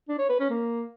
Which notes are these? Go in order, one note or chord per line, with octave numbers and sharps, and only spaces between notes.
D4
C#5
B4
C#4
A#3